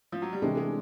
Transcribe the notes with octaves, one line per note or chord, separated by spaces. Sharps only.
F3
F#3
G3
C3 E3 G#3 A3 D4 G4
G#3